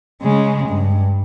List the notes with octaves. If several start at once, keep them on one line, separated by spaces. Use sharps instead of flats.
C#3 G#3
G2